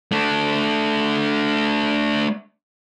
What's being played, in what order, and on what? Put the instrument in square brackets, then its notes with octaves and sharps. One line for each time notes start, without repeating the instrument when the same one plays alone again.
[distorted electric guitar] A3 D4